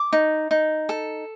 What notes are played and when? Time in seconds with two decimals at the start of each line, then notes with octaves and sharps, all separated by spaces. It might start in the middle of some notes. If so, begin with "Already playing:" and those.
Already playing: D6
0.13 D#4
0.51 D#4
0.89 A4